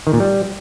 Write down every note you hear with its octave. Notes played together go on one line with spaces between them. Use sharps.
D#3
A#2
G3